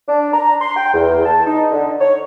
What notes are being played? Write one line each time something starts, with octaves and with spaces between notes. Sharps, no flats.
D4
A#5
C6
G5
E2
A5
D#4
D3
C#5